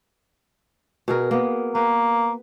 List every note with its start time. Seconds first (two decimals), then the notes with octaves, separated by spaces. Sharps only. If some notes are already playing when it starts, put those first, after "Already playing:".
1.08 B2 G#4 A#4
1.31 A#3 B3
1.75 A#3 B4 G5